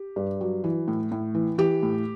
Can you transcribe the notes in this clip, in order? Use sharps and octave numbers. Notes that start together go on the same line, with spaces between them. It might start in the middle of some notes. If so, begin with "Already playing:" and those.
Already playing: G4
G2
F#3
E3
A2
A2
E3
E3 G4
A2